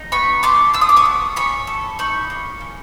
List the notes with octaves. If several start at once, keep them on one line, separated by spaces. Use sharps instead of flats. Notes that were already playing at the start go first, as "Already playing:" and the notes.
Already playing: D#4
B3 B5 C#6
D4 C6 D6
D4 E6
D#6
D6
C#6 D#6
B3
C#4 B5 C#6
A4
D#4 B5 C#6
A#3
C#4